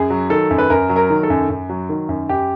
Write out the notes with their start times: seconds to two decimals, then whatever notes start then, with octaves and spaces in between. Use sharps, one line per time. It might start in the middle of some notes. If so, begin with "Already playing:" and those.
Already playing: F#2 G#4
0.10 F#3
0.30 D#3 A4
0.51 F#2
0.58 B4
0.70 F#2 A#4
0.89 F#3
0.96 A#4
1.10 D#3
1.23 A4
1.30 F#2
1.50 F#2
1.69 F#3
1.89 D#3
2.09 F#2
2.29 F#2 G4